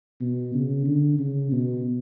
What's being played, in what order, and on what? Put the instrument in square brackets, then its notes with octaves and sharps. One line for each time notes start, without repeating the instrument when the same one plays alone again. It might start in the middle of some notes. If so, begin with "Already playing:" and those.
[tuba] B2
C#3
D3
C#3
B2